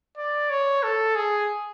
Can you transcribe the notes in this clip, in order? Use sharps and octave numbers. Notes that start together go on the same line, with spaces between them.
D5
C#5
A4
G#4